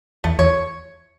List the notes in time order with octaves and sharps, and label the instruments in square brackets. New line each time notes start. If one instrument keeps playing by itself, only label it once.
[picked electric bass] E2 [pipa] A3
[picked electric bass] E2 [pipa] C#5